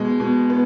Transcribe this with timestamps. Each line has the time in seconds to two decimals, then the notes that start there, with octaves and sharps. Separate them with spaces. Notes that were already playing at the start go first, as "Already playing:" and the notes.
Already playing: B2 G#3
0.20 B2
0.50 B3